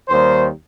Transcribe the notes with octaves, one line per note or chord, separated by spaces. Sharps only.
D#2 D#3 G3 C5